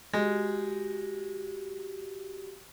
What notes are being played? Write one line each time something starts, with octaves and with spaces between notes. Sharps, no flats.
G#3 F#4 G4